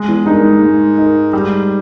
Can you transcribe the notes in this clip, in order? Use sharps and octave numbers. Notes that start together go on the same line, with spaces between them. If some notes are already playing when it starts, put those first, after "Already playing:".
Already playing: G#3
E2
G2 D#4 A#4
G#2
G#3
D#4 A#4
G3